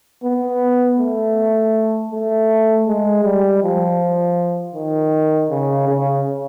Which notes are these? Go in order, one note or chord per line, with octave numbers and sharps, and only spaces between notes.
B3
A3
A3
G#3
G3
F3
D#3
C#3
C#3